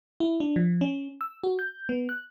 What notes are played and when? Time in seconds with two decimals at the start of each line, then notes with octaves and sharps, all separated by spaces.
0.20 E4
0.40 D4
0.56 F3
0.81 C#4
1.21 E6
1.44 F#4
1.59 G6
1.89 B3
2.09 F#6